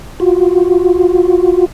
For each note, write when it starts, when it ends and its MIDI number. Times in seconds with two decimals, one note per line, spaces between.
0.20 1.66 65
0.20 1.66 66